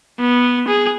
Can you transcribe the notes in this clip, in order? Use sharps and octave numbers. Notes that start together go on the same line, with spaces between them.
B3
G#4